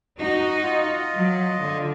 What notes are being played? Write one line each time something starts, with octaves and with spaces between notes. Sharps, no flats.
D#4 F#4
F4 D#5
F#3
D3